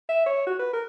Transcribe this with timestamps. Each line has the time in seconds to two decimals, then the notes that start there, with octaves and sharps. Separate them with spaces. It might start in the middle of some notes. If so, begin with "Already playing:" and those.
0.09 E5
0.26 C#5
0.47 F#4
0.59 B4
0.73 A#4